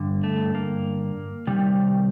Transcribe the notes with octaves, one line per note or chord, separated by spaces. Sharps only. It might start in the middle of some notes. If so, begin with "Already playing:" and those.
Already playing: G2 D3
A3
A#3
C3 D#3 G3